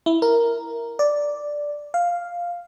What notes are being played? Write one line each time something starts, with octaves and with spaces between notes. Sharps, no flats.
E4
A#4
D5
F5